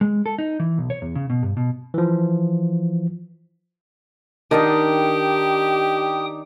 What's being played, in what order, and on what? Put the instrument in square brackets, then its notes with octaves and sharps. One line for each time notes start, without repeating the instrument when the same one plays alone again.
[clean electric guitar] G#3
A4
D#4
E3
B1
C#5
E2
C#3
B2
G2
B2
[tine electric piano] E3 F3
[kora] D#3 [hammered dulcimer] D4 D#4 D5 [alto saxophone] G4 [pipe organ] G5 D#6